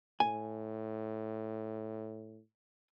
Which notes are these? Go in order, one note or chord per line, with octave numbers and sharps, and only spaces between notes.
A2 G#5